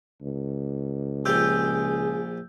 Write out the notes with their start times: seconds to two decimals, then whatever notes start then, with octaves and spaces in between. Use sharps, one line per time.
0.22 C#2
1.25 A#1 F4 G4 G#4 E6 G6